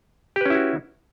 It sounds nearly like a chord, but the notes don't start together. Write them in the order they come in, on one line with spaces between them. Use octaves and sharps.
G4 B4 C#4 E4 F#4